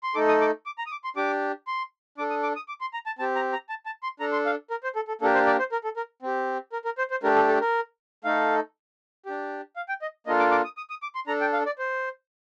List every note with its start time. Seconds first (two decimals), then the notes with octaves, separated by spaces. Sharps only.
0.03 C6
0.15 A3 D#4 A4 D6
0.28 D#6
0.41 D6
0.66 D6
0.78 A#5
0.86 D#6
0.92 D6
1.04 C6
1.16 D4 G4 D6
1.67 C6
2.18 D4 A4 D6
2.30 D#6
2.43 D6
2.56 D#6
2.68 D6
2.81 C6
2.93 A#5
3.06 A5
3.19 C4 A5
3.22 G4
3.36 A#5
3.53 A#5
3.69 A5
3.86 A5
4.03 C6
4.20 D4 A4 A#5
4.32 C6
4.46 F5
4.70 A#4
4.84 C5
4.96 A4
5.08 A4
5.21 A#3 D4 G4 A4
5.34 C5
5.47 D5
5.59 C5
5.72 A#4
5.84 A4
5.97 A#4
6.22 C4 G4
6.73 A#4
6.85 A#4
6.98 C5
7.11 C5
7.23 A3 D4 G4 A#4
7.36 A4
7.48 A4
7.61 A#4
8.25 A3 D#4 A4 F5
9.26 D4 G4
9.76 F5
9.89 G5
10.02 D#5
10.27 A#3 D4 F4 A4 D#5
10.39 D6
10.51 D6
10.64 D#6
10.77 D#6
10.90 D#6
11.02 D6
11.15 C6
11.27 D4 A4 A#5
11.41 G5
11.53 F5
11.66 D5
11.79 C5